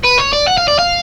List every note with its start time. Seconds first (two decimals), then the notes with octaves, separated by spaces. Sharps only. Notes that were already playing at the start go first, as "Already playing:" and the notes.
0.04 B4
0.18 C#5
0.33 D5
0.47 F#5
0.57 F5
0.68 D5
0.79 F5